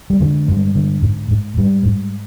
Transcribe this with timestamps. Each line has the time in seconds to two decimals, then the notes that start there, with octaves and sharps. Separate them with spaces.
0.10 G3
0.20 D3 G#3
0.48 G2 G#3
0.75 D3
1.03 G#2
1.31 G#2
1.57 G#2 G3
1.85 G#2